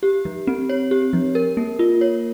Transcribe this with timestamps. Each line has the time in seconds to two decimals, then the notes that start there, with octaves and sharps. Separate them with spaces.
0.03 G4
0.25 F3
0.47 C4
0.69 C#5
0.91 G4
1.13 F3
1.35 A#4
1.57 A#3
1.79 F4
2.01 C#5